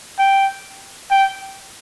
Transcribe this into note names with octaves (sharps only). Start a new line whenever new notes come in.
G5
G5